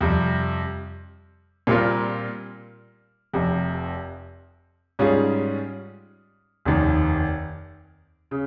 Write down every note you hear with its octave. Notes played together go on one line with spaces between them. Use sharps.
F2 C3 G3
A#2 G3 C4 F4 A#4
F1 F2 C3
G#2 G3 C#4 F4 G#4
F1 D#2 D#3
C#3